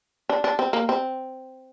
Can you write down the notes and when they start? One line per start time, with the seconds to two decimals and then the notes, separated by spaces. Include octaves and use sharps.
0.29 D4
0.44 D4
0.59 C4
0.73 A#3
0.89 C4